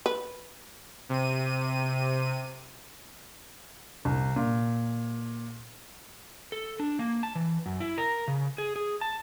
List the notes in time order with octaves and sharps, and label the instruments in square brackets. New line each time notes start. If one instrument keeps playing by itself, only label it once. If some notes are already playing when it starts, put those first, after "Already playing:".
[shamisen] B4
[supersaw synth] C3 D#7
[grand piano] C2
A#2
[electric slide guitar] A4
D4
A#3
A5
E3
F#2
E4
A#4
C#3
G#4
G#4
A5